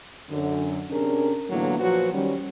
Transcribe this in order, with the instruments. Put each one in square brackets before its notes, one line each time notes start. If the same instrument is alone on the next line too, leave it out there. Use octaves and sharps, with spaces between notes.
[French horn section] F#2 D3
C3 C#4 D4 G#4 A#4
A2 D3 E3 F#3 A#3 B3
A#2 F3 F#3 F#4 B4 C5
D#3 G3 C#4